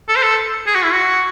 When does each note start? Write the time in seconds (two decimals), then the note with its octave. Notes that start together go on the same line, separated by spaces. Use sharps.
0.09 A4
0.16 C5
0.23 A4
0.67 G#4
0.75 F#4
0.84 E4
0.92 F#4